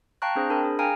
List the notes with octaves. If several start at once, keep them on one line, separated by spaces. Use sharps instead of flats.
F5 G5 A5 A#5 C#6 F#6
C4 D4 G#4 C5
D4 A#4 A5 B5
G#4
F5 G5 G#5 A#5 F6